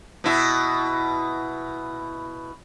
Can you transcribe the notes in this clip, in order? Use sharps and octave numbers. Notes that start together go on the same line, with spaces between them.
B2 E4